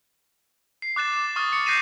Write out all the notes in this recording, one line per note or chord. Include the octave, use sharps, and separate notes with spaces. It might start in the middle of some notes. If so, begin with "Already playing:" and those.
C7
D6 F#6 A6 E7
E7
C#6 D#6 F6 A6
C#7
F#6 G6 A#6 C7 D#7 E7